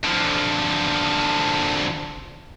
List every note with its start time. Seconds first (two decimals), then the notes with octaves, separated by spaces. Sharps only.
0.04 D3 F3